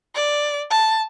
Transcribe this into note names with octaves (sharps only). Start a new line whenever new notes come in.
D5
A5